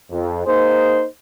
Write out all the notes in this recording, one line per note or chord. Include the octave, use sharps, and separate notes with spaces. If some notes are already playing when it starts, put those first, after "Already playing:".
F2
A#3 D#4 G#4 C5